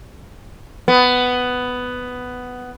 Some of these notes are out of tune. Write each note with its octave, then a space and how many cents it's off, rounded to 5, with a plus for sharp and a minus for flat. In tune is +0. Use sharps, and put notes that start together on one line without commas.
B3 +10